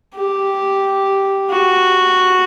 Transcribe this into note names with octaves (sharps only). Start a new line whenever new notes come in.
G4
F#4